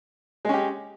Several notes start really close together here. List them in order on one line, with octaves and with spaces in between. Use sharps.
G#3 C#4 G4